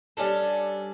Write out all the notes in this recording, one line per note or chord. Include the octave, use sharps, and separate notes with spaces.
G3 C#4 D4 A4